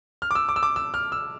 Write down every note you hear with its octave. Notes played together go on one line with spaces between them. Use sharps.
F6
D6
E6
D6
E6
D6
E6
F6
E6